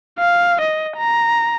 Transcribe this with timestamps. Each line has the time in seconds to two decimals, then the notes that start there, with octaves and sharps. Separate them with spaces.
0.19 F5
0.61 D#5
0.97 A#5